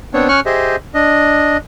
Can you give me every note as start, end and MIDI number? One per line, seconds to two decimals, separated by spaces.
0.14 0.28 59
0.14 0.28 60
0.14 0.28 62
0.14 0.28 73
0.29 0.40 61
0.29 0.40 73
0.29 0.40 85
0.29 0.40 89
0.29 0.40 90
0.46 0.76 67
0.46 0.76 68
0.46 0.76 72
0.46 0.76 75
0.46 0.76 76
0.94 1.57 62
0.94 1.57 75